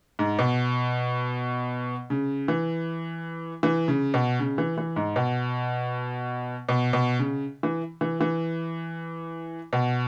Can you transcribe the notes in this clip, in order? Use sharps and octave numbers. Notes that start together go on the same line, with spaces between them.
G#2
B2
C#3
E3
E3
C#3
B2
C#3
E3
E3
G#2
B2
B2
B2
C#3
E3
E3
E3
B2